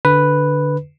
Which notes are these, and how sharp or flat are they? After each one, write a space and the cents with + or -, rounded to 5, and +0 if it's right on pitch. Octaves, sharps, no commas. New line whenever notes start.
D3 +0 B4 +0